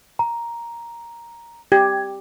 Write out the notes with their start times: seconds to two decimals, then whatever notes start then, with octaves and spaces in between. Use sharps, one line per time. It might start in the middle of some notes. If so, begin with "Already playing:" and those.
0.19 A#5
1.72 G4 G#6